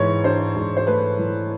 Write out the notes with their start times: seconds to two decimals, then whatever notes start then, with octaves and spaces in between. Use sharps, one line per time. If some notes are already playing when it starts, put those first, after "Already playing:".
Already playing: G#2 E3 C#5
0.24 D4 C5
0.56 G#2
0.77 C5
0.87 A3 B4
1.19 E3